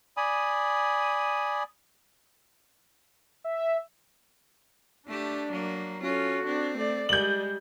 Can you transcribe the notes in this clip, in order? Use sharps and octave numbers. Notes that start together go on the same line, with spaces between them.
D5 G#5 B5 D#6
E5
A3 D4 G4
F#3 A#3
C#4 F4 F#4 A4
C4 D4
A3 D5
G3 G#3 D5 G6 F#7